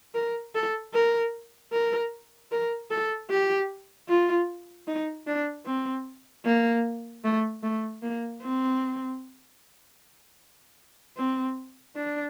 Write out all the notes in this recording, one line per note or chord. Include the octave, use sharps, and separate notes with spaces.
A#4
A4
A#4
A#4
A#4
A4
G4
F4
D#4
D4
C4
A#3
A3
A3
A#3
C4
C4
D4